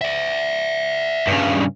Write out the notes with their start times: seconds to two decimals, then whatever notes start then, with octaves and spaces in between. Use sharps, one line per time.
0.01 D5 E5
1.27 G2 C#3